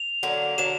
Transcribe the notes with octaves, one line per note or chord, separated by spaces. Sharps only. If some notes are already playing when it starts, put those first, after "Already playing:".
Already playing: F7
D3 F#3 A#3
D3 F#3 A#3 E7